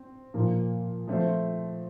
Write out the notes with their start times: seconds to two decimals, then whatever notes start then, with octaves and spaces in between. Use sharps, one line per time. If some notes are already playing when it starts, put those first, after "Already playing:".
Already playing: C4
0.34 A#2 F3 A#3
1.07 F3 A3 C4 F4 C5